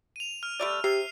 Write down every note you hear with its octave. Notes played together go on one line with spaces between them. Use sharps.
D#7 F7
F6
G3 A3 D5
C3 G4 C7